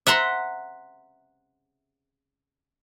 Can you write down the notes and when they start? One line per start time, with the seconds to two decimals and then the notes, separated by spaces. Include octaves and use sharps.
0.07 E5 F#5 A#5 C6